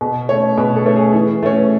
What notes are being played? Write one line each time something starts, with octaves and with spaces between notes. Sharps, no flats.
B2
A3 C#4 C#5
B2 B4
A4
A3 C#4
G#4
E3
A3 C#4